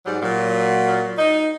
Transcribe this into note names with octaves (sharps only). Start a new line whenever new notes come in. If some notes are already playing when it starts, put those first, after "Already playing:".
G#2 F#3 G3
A#2 F#3
D#4